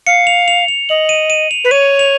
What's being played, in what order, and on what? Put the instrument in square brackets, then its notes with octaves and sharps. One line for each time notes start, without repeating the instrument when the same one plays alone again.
[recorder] F5 [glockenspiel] C#7
[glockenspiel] F7
F7
F7
[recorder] D#5 [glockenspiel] F#7
[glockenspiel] D#7
D#7
F7
[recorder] B4
[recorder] C#5 [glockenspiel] D#7
[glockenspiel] F7